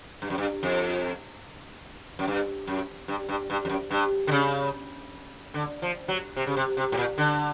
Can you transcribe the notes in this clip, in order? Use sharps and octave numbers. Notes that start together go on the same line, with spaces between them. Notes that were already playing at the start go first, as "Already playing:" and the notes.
G2
F#2
G2
F2
F#2
G2
F#2
G2
G2
G2
F2
F#2
G2
D3
C#3
D3
F3
F#3
C3
C#3
C3
C3
A2
A#2
D3